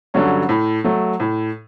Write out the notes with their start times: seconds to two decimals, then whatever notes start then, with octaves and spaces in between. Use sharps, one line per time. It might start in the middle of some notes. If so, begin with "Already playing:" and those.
0.14 G2 D3 F#3 C#4
0.49 A2
0.84 F#3 A3
1.20 A2